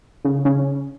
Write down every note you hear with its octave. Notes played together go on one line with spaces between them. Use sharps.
C#3
C#3